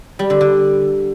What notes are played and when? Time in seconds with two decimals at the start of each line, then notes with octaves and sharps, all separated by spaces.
0.19 G3
0.30 D3
0.41 D3